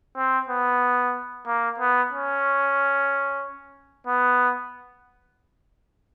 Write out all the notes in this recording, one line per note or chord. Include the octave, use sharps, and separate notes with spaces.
C4
B3
A#3
B3
C#4
B3